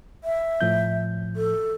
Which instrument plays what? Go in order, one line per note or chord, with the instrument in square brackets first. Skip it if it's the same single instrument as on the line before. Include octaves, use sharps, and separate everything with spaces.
[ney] E5
[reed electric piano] A2 F3 G6
[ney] A4